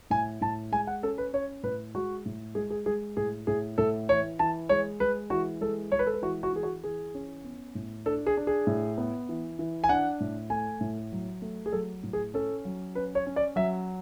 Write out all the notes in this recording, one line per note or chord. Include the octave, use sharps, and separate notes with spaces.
A2 G#5
A2 A5
G#3 G#5
F#5
C#4 A4
B4
C#4 C#5
A2 B4
G#3 F#4
A2
G#3 G#4
G#4
G#3 G#4
A2 G#4
A2 G#4
A2 A4
E3 C#5
E3 A5
G#3 C#5
G#3 B4
E3 F#4
G#3 A4
G#3 C#5
B4
A4
B4
E3 F#4
F#4
E3 G#4
F#4
E3 G#4
C#4
B3
A2
D4 A4
G#4
D4
G#4
A2
B3
E3
E3
G#5
D4 F#5
A2
A3 G#5
A2
F#3
A3
G#4
F#3 A4
A2
G#4
C#4 A4
F#3
C#4 B4
C#5
C#4
D5
F#3 E5